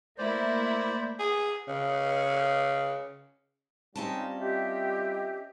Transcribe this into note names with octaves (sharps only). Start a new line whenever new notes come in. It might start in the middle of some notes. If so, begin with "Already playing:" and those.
A3 A#3 E4 C5 D5
G#4
C#3
G3 C4 C#4 D#4 F4 A5
G4 D#5 E5